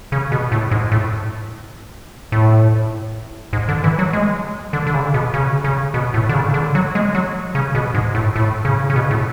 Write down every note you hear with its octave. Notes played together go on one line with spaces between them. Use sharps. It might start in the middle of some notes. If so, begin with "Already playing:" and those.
C#3
B2
A2
G#2
A2
A2
G#2
D3
E3
F#3
G#3
D3
D3
C#3
B2
C#3
C#3
B2
A2
D3
C#3
D3
F#3
G#3
F#3
C#3
B2
G#2
A2
A2
C#3
C#3
B2
A2